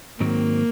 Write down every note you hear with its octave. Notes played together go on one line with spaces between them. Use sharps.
G#2 D#3 F#3 A#3 C4